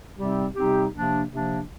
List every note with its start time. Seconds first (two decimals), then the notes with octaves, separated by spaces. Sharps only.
0.17 C3 G3 C4 D#4 G4
0.55 C3 G3 C4 D#4 G4
0.92 C3 F3 A#3 D4
1.31 C3 F3 A#3 D4